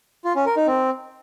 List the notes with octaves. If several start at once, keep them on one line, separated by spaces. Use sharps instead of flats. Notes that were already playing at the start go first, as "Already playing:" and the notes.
F4
C#4
A#4
D#4
C4